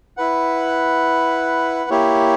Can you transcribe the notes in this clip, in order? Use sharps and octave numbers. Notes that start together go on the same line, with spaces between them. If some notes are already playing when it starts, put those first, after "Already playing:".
E4 B4 F#5
A#3 E4 G4 C#5